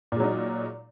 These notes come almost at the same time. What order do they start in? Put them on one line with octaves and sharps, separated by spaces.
A#2 G#3 F#3 D#4